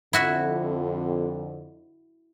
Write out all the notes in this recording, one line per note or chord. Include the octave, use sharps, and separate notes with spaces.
F2 D3 E4 F#4 E5